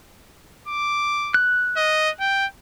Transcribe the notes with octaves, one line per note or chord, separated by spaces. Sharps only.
D6
F#6
D#5
G5